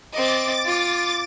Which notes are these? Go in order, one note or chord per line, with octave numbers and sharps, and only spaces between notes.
C4 D#5 D6 A6
F4